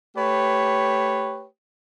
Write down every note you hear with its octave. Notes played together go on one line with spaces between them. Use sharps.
A3 G4 B4 C#5